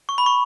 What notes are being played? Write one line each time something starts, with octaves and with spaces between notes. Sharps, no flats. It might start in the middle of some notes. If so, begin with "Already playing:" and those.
C#6
B5
C#6